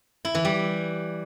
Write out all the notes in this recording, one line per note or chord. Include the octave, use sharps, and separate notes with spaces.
E4
E3
G3